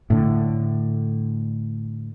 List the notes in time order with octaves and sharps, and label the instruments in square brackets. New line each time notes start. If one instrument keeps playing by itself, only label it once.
[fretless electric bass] A2 D3